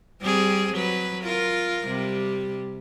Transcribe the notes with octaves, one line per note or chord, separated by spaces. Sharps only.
G3 C4 G#4
F#3 B4
F4 A#4
C3 G3